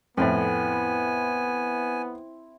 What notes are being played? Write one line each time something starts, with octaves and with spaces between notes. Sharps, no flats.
F2 A2 B3 C4 E4 G#5